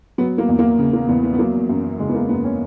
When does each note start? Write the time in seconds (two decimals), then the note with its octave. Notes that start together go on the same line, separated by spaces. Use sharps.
0.18 F#3 B3
0.38 A#3
0.48 E2
0.59 A#3
0.79 C#3
0.93 A#3
1.09 E2 B3
1.23 B3
1.34 B3
1.39 F#3 A#3
1.69 F#2
1.99 C#3 G#3
2.09 B3
2.14 A#3
2.29 F#2 B3
2.44 C#4